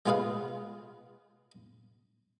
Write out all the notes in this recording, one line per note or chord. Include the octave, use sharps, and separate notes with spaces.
G#3 B3 F4 G#4 B4 F5